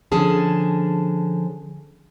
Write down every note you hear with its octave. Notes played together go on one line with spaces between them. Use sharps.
D3 F3 C#4 G#4 A5